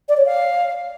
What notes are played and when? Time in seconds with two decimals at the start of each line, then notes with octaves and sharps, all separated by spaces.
0.09 D5
0.17 C#5
0.25 F5